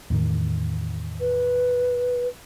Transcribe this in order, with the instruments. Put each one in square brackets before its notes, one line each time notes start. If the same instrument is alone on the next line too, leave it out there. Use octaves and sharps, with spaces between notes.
[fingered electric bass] E2 A2 D#3
[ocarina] B4